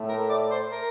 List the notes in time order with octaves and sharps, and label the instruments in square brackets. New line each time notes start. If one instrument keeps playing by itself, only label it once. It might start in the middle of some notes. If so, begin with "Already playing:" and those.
Already playing: [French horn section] A2 A3
[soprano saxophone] A#4
D5
C5
A#4